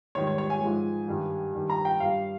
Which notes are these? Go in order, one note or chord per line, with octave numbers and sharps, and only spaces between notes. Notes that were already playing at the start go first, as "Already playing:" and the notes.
G#2 D#3 G3 C#5
C#5
C#5
G#5
G#2 F3 G#3
G2 D#3 G3
G2 D#3 G3
A#5
G5
G2 G3 F5